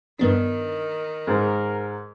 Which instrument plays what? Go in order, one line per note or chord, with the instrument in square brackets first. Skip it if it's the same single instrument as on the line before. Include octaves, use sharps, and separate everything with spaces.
[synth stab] G2 B3 D4 [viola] D#3
[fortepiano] G#2 [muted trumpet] A#4